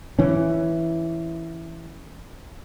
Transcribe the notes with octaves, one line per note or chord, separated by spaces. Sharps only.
E3 C#4